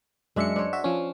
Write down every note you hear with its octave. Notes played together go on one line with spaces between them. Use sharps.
F#2 G#3 D4 E5 C#7
D4 C5 C#5
F#4 E5
F3 C#4